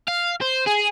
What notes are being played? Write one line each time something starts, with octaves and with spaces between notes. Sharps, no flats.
F5
C5
G#4